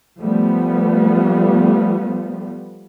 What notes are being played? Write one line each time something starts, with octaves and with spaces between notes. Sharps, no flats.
F3 G3 A3 B3